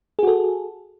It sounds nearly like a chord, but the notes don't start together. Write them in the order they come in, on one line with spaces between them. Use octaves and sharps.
G#4 F#4 A4